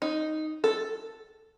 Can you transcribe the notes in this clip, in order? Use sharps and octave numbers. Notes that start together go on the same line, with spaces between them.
D#4
A4